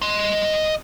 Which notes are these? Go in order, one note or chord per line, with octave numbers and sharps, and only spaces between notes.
D#5 C6